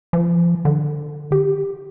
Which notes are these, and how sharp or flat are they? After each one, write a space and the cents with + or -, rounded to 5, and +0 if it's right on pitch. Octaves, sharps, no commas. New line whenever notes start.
F3 -30
D3 +25
G4 +10